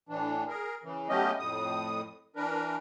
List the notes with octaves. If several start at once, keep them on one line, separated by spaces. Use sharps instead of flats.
A2 E3 D4
G#4 A#4
C#3 E3
F#3 A3 B3 C#4 G4 D#5
F2 A2 D#6
E3 D4 A#4 B4